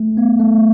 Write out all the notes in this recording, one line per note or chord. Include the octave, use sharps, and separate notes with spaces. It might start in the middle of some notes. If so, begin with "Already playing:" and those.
Already playing: A3
B3
A3